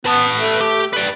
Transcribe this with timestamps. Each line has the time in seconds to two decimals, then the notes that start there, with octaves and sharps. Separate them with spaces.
0.05 B3 B4 A5
0.36 A3
0.61 G4
0.93 B4 D5